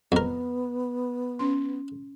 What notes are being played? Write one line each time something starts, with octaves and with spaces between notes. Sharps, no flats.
F2 B3 A#4
C#4 C6